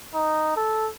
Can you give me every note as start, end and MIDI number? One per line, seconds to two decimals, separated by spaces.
0.14 0.53 63
0.56 0.90 69